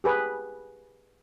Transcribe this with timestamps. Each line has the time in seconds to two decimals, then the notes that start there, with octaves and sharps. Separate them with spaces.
0.04 G4 G#4 B4